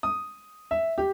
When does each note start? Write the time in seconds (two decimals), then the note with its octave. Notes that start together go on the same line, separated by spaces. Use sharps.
0.03 D#6
0.71 E5
0.98 G4